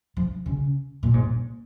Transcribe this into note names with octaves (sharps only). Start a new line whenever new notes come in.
F3
C#3
A#2
G#2
A#2